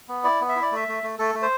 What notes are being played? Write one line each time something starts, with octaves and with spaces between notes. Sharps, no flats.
B3
E4 D5
B3
E5
E4
D5
A3 E5
A3
A3
A3 A4
A3
C5